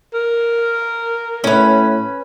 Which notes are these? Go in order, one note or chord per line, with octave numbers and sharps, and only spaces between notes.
A#4
A2 C#4 B4